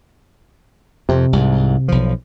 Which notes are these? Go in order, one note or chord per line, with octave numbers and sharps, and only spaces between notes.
F2 C3
C2 G#2
B1 F3